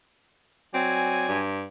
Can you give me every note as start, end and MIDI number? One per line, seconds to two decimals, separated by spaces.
0.74 1.41 54
0.74 1.25 60
0.74 1.41 74
0.74 1.41 80
1.29 1.65 43